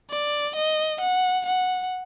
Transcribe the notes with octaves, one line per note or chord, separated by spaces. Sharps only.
D5
D#5
F#5
F#5